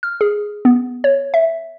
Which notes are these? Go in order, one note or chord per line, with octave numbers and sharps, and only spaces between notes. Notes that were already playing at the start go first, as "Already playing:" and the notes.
F6
G#4
B3
C#5
E5